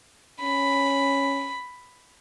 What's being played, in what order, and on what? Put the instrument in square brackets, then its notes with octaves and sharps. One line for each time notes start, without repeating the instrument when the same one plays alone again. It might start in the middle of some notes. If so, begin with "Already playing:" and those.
[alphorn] C#4 [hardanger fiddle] B5